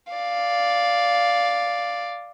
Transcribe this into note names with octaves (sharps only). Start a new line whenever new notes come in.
D5 F5